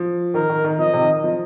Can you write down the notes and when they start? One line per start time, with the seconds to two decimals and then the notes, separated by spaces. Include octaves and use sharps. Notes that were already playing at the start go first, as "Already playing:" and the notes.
Already playing: F3
0.34 D#3 A#4
0.50 D#3
0.64 D#3
0.79 F3 D#5
0.93 C3
1.02 D#3
1.24 F3